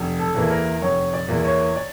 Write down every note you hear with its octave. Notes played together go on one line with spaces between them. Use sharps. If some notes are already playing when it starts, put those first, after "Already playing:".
Already playing: F1
A4
E2 E3 A#3
A#4
F1 C#5
D5
E2 E3 A#3
C#5
D5